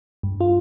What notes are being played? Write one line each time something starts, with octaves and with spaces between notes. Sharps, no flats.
G2
F4